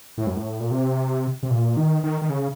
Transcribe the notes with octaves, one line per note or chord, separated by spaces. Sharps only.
A2
F#2
A2
A#2
C3
C3
A#2
D#3
D#3
D#3
C#3